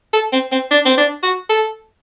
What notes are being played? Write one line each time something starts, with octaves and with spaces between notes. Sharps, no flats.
A4
C4
C4
D4
C4
D4
F#4
A4